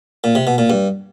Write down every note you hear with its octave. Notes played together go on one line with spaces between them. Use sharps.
A#2
C3
B2
A#2
G2